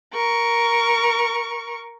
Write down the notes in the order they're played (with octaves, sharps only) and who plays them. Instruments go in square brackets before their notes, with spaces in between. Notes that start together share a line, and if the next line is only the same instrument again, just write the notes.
[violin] A#4 C#6